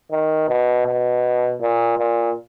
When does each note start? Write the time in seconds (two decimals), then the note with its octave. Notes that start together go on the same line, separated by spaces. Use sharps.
0.12 D#3
0.49 B2
0.87 B2
1.62 A#2
1.99 A#2